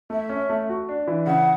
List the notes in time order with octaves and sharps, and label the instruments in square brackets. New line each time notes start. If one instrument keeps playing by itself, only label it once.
[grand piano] A3 [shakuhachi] E5
[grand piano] C#4
A3
F#4
D4
E3
[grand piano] C#3 [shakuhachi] F#5